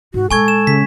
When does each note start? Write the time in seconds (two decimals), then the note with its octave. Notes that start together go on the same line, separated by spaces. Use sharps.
0.14 G#2 F#4
0.31 A#2 G#3 A4 G#5 C#6 G#6
0.48 E7
0.67 C#3 B6